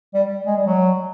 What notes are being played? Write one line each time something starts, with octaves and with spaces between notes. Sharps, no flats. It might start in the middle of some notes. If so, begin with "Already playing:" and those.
G3
G#3
G3
F#3